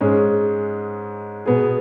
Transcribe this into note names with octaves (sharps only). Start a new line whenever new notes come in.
G#2 G#3 C#4 G#4
B2 B3 G#4